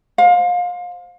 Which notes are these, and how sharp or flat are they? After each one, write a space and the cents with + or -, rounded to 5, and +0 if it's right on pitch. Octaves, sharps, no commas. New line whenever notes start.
C5 +0 F5 +30